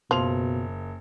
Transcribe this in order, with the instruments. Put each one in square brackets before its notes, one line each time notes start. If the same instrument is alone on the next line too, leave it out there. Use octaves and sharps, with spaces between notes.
[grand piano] F#1 F7 [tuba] B2 [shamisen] F3